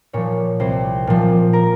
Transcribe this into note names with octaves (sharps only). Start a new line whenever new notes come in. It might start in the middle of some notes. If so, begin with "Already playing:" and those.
A#2 F3 C#5
C2 C5
A#2 F3
A#4